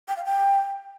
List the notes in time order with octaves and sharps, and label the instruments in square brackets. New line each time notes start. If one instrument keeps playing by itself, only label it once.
[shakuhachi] G5
F5
G5